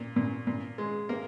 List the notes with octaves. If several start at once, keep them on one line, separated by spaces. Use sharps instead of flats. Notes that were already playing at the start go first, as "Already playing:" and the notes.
Already playing: A#2
A#2
A#2
G#3
A#3 A#4